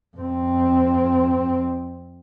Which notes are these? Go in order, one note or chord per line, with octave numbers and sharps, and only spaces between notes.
F2 C4